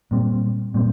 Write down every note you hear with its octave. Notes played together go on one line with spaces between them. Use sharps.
A#2 G3 C4
A#2 G3 C4